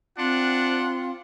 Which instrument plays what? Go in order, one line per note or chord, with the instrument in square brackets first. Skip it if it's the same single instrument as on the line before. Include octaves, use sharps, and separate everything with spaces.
[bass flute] C4 [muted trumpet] D4 [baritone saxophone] F4 [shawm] F#5